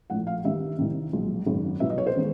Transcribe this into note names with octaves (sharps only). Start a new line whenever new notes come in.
A#1 A2 F3 A3 F#5
F5
G2 D#3 G3 E5
C2 C3 D#3
B1 A#2 F3 G#3
G#1 F#2 C#3
C2 B2 F#3 B3 E5
D#5
C#5
C5
D#3 G#3 B3